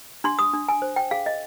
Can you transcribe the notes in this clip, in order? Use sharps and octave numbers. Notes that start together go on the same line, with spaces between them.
D4 C6
D#6
D4
G#5
C5
G5
G#4 F5
D#5